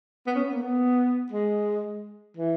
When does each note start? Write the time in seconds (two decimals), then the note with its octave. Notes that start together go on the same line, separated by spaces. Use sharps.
0.26 B3
0.35 C#4
0.43 B3
0.53 A#3
0.61 B3
1.31 G#3
2.37 E3